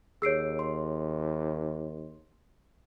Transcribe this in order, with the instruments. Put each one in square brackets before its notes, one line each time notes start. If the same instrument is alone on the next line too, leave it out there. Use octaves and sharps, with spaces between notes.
[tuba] D#2 [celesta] G#4 C#5 [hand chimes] E6 C7 D7
[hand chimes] C6